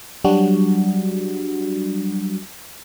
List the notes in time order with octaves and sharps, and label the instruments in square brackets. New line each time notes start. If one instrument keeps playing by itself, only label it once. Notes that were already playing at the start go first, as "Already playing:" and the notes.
[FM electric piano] F#3 G3 D4 F#4